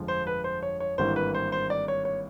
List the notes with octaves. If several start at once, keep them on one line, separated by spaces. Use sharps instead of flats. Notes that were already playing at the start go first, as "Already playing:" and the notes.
Already playing: G1 F2 D3 F3 G#3
C5
B4
C5
C#5
C#5
G#1 G2 E3 G3 A#3 C5
B4
C5
C5
D5
C#5
C#5